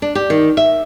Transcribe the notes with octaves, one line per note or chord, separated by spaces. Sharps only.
D4
G4
D#3
E5